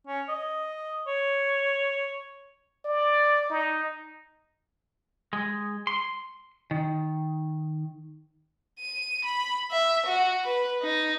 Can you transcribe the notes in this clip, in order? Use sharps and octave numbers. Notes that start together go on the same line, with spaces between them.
C#4
D#5
C#5
D5
D#4
G#3
C6
D#3
D#7
B5
E5
F#4
B4
D#4